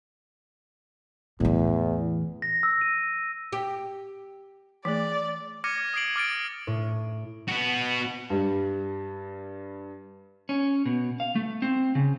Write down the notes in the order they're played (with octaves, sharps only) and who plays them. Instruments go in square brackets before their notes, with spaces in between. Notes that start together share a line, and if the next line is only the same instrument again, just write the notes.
[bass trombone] E2 [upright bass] A2 E3
[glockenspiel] A#6
E6
D#7
[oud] G4
[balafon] E3 A3 G#4 [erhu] D5
[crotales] D6 F6 G#6 A#6 C#7 D#7
D#6 G#6 C7 D7 F#7
D6 F6 A6 D7
[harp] A2
[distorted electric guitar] B3 F#4
[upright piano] G2 G3
[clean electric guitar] C#4
B2
F5
A3
C4
C#3